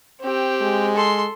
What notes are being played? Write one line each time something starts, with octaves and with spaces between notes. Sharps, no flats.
C4 G4
G#3
A4 C6